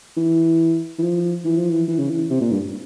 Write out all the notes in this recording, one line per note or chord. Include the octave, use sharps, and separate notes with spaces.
E3
E3
F3
E3
F3
E3
E3
C#3
E3
C3
A#2
G2